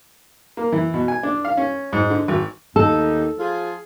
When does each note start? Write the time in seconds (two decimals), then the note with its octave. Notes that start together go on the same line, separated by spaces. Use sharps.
0.57 A#3
0.72 E3
0.94 B2
1.08 G#5
1.23 D4
1.45 F5
1.57 C#4
1.93 G#2
2.10 D3
2.28 G#1
2.76 D#2 D#4 A4
3.39 F3 F4 G#4